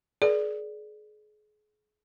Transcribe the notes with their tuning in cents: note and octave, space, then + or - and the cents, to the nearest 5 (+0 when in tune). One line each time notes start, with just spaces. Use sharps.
G#4 +35 B4 -45 D5 +0